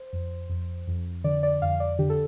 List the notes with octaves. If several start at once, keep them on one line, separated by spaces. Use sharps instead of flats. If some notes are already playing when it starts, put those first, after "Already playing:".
Already playing: C5
F2
F2
F2
D3 D5
D5
F2 F5
D5
D3 G4
A4